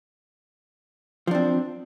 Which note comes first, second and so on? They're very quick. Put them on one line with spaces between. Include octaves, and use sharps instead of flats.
F3 D4 C4